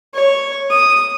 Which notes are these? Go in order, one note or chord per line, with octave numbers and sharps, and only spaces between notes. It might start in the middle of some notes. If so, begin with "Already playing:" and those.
C#5
D#6